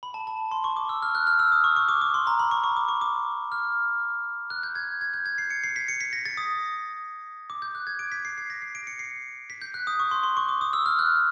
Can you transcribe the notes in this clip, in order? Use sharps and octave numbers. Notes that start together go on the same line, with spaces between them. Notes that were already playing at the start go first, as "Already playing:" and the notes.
B5
A5
A5
C6
C#6
D6
E6
F6
F#6
F6
E6
D#6
C#6
C#6
D6
D6
C6
A#5
B5
C#6
C#6
D6
C#6
D6
F6
F#6
G6
G#6
G#6
G6
G#6
C7
C#7
C7
B6
C#7
B6
A#6
A6
D#6
D6
G6
F#6
G#6
D7
B6
C7
C7
A#6
C7
D7
C#7
C7
B6
G6
F#6
D#6
C#6
C6
C6
C#6
D6
D#6
E6
F6
F#6